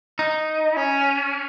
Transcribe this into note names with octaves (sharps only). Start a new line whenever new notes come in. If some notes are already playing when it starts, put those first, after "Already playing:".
D#4
C#4